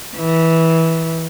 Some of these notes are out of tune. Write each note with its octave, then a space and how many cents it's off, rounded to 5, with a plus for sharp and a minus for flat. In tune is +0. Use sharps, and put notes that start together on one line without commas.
E3 -15